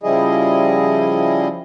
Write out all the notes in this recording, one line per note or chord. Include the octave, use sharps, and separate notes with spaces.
C#3 F3 G3 E4 G#4 D#5